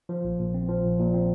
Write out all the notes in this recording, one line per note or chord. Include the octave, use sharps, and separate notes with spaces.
F3
A#1
A#2
C4
F3
A#1
A#2
C4